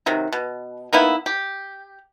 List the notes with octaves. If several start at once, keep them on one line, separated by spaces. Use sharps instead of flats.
C3 D#3 F#3
B2
A#3 B3 D#4 E4
G4